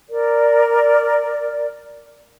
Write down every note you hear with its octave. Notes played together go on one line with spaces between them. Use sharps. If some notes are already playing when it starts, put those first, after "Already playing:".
A#4 D5